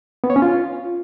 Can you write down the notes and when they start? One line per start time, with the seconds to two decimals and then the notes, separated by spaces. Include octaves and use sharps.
0.24 B3
0.30 C#5
0.36 C#4
0.42 F4